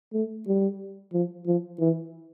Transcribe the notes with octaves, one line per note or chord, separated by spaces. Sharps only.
A3
G3
F3
F3
E3